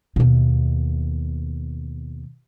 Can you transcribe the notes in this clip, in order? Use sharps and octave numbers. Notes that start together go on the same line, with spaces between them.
D#2 B2